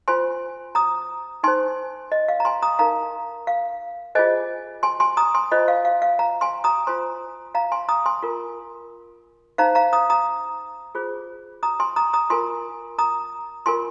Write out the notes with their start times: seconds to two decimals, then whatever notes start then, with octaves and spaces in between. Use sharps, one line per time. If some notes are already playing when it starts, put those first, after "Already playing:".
0.08 F4 C5 G#5 C6
0.75 A#5 D#6
1.43 D#4 C5 G#5 C6
2.12 D#5
2.28 F5
2.40 A#5
2.45 G#5 C6
2.62 A#5 D#6
2.79 D#4 A#4 F5 A#5
3.47 F5
4.15 F4 G#4 C5 D#5 G#5
4.83 G#5 C6
5.00 G#5 C6
5.17 A#5 D#6
5.35 G#5 C6
5.52 F4 C5 D#5
5.68 F5
5.85 F5
6.02 F5
6.19 F5 A#5
6.41 G#5 C6
6.64 A#5 D#6
6.87 F4 C5 G#5 C6
7.55 F5 A#5
7.72 G#5 C6
7.89 A#5 D#6
8.06 G#5 C6
8.23 F4 A#4
9.58 D#4 C5 F5 A#5
9.75 F5 A#5
9.93 A#5 D#6
10.10 A#5 D#6
10.95 F4 G#4 C5
11.63 A#5 D#6
11.80 G#5 C6
11.96 A#5 D#6
12.13 A#5 D#6
12.30 F4 A#4 G#5 C6
12.98 A#5 D#6
13.66 F4 A#4 G#5 C6